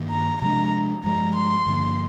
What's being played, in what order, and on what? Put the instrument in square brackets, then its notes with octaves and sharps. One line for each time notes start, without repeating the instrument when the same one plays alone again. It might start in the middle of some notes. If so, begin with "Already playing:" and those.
Already playing: [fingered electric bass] G2 D#3 A#3
[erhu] A#5
[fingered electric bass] C3 F3 G#3 D4 [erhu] A#5
[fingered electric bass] G2 F3 G#3 [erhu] A#5
[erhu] C6
[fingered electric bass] G2 D3 F3 A#3